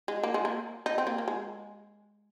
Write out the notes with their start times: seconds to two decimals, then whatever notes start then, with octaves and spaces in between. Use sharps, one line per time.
0.08 G#3
0.23 A#3
0.34 G#3
0.45 A#3
0.86 D#4
0.98 C4
1.07 A#3
1.18 A#3
1.28 G#3